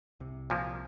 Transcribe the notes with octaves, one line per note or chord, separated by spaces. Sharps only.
C2 C3
A#2 F3 A#3